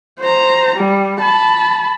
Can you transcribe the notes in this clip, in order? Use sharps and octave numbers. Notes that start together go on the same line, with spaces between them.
C5 A#5
G3
A5 B5